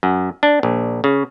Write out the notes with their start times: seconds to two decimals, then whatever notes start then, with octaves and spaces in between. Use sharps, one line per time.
0.03 F#2
0.43 D4
0.63 A#1
1.04 C#3